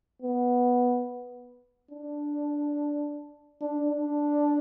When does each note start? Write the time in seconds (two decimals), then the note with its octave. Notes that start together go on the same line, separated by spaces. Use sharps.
0.22 B3
1.91 D4
3.61 D4
3.90 D4